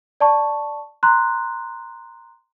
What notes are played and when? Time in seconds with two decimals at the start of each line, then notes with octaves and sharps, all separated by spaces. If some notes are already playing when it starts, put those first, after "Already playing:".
0.20 D5 A5 C#6
1.03 A#5 C6 F#6